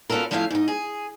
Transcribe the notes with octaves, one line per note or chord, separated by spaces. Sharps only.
B3 C#4 F4 F#4 A4 A#4
F3 A3 C#4 E4 E5 F5
G#2 D#4
G#4